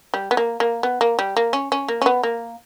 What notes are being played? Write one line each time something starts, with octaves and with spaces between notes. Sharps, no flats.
G3
B3
A#3
A#3
B3
A#3
G3
A#3
C#4
C#4
A#3
C#4
B3
A#3